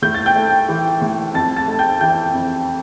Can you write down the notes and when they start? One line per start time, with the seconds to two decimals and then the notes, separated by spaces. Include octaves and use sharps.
0.02 A2 G6
0.14 A6
0.26 G5 G6
0.36 A3
0.69 E3
1.01 A2
1.35 F2 A5 A6
1.56 A5 A6
1.68 A3
1.79 G5 G6
2.01 E3 G5 G6
2.34 F2